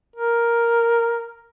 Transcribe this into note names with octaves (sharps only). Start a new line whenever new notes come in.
A#4